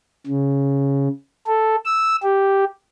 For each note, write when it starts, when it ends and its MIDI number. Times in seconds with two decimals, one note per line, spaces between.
0.27 1.08 49
1.47 1.76 69
1.85 2.16 88
2.23 2.65 67